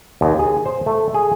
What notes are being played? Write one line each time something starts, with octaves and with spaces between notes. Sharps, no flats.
D#2
G#4
C5
A3
G#4